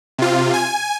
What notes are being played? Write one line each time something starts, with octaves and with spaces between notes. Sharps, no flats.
C3 F4
G#5